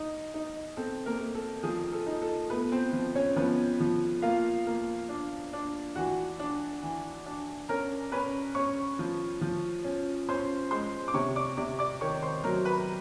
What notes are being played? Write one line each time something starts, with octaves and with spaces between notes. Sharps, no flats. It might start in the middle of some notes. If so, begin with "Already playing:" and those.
Already playing: D#4
D#4
C4 A4
A#3 A#4
A3
A4
F3 G#4
A4
D#4
A4
A3 B3 B4
C4 C5
F3
C#4 C#5
F3 B3 B4
F3
A#3 F4 F5
A#3
D4
D4
E3 F#4 F#5
D4
E3
D4
C#4 A#4 A#5
C#4 B4 B5
C#4 C#5 C#6
F3
F3
C#4
C#4 C5 C6
G#3 C5 C6
D6
C3 C#5 C#6
D5 D6
C3 D5 D6
D5 D6
D#3 C#5 C#6
C5 C6
F#3 A#4 A#5
B4 B5